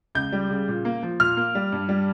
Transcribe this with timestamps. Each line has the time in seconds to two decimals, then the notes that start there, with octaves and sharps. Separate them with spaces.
0.15 C#2 G6
0.32 G3
0.50 C#3
0.68 A#2
0.85 A#3
1.03 F3
1.20 A#2 F6
1.37 A#3
1.55 G3
1.72 G2
1.89 G3